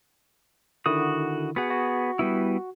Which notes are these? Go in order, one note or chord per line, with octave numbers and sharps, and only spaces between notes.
D3 D#3 E4 F#4 D#6
B3 F#4 G#4 F#5
F#4
G3 B3 E4